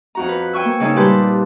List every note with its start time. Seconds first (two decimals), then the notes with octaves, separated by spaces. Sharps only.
0.15 F2 F#4 A#5
0.29 B4
0.53 G5 G#5 C#6 E6
0.65 A#3
0.80 C#3 G#3 C#4 D#4 E6
0.96 A#2 G3 G4 B4 A5 C6